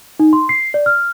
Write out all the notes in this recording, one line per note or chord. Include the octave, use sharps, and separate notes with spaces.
D#4
C6
C7
D5
F6